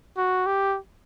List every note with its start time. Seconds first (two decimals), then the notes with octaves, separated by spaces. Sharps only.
0.17 F#4
0.46 G4